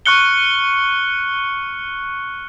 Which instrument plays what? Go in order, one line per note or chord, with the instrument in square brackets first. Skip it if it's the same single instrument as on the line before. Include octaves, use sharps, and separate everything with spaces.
[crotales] C#6 F6 F#6 C#7 G7